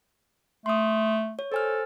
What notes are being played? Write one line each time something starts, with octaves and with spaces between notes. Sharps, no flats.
A3 C6 D#6
C#5
A4 C5 G#5 F6